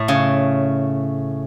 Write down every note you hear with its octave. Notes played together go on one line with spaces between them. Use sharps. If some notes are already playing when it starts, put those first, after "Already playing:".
Already playing: A2
C#3